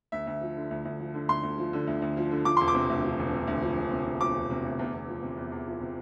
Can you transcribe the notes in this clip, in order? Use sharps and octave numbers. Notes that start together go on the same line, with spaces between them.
D2 E5
D2
F3
D3
D2
D2
F3
D3
D2 C6
D2
F3
D3
D2
D2
F3
D3
F3 D6
E1 C6
D6
C3
D2
F3
E1
C3
D2
F3
E1
C3
D2
F3 D6
E1
C3
D2
E2
E2
F3
C3
E2
E2
F3
C3